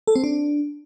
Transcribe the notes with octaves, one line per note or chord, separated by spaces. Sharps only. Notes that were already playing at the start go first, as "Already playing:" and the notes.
A4
C4
D4